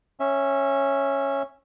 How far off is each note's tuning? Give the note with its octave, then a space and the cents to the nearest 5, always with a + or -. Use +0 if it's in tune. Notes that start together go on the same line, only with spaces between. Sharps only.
C#4 -10 E5 +0